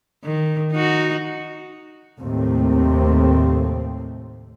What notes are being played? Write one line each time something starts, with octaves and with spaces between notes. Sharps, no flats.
D#3
D#4 F#4
D#2 A2 C3 A3 C4